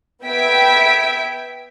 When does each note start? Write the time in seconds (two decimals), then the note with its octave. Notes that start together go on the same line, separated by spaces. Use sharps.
0.23 B3 E5 G5 G#6 B6 D7